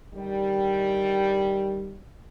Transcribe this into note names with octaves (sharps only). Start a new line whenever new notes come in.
D3 D#3 G3